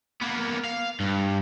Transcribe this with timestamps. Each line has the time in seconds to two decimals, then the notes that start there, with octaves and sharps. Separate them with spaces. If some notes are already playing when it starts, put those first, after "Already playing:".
0.22 A#3 B3
0.65 F5
1.00 G2